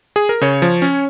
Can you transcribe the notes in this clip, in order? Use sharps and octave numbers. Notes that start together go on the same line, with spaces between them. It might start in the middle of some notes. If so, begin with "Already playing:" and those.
G#4
A#4
C#3 C#5
F3
C#4